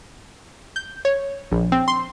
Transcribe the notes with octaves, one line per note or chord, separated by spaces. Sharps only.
G6
C#5
A#1
C4
C6